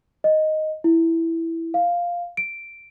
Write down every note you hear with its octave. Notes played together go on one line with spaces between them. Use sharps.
D#5
E4
F5
D7